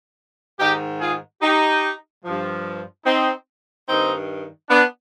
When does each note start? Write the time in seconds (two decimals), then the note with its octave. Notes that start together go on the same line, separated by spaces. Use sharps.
0.60 G#2 D#3 D#4 G4
1.01 F4 G#4
1.42 D#4 G4
2.24 G2 F3
3.06 C4 D#4
3.88 G2 D#3 C4 D#4
4.69 B3 D4